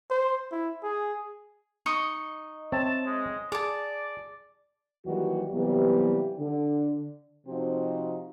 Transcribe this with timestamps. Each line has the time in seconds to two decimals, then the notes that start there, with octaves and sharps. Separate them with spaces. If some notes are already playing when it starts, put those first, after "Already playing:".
0.10 C5
0.52 E4
0.83 G#4
1.86 D#4 D#5 C#6
2.72 C4 C#5 E5 A5
3.06 G#3
3.52 G#4 D5 A5 D6
5.07 D#2 E3 F#3 G3 F#4
5.54 C3 E3 F#3 G3 A#3 B3
6.39 D3
7.47 C3 F3 C4 D#4 F#4